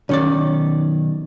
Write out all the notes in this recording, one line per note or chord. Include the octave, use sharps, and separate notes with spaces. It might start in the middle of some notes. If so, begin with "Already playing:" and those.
B1 D#3 C#4 D5